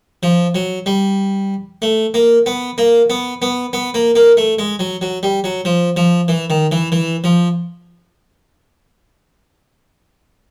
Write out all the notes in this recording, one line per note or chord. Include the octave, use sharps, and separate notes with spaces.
F3
F#3
G3
A3
A#3
B3
A#3
B3
B3
B3
A#3
A#3
A3
G#3
F#3
F#3
G3
F#3
F3
F3
E3
D#3
E3
E3
F3